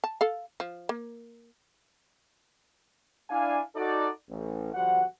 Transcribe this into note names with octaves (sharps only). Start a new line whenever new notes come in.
A5
A4 F5
F3
A#3
D4 E4 F5 G#5
D#4 F#4 A4 D5
A1
G1 F3 G3 F#4 F#5